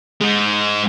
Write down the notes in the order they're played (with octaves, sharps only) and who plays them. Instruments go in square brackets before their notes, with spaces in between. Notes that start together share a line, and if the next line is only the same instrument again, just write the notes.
[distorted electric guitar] G#3 D#4